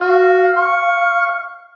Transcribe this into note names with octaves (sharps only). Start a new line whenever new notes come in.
F#4 F5
C#6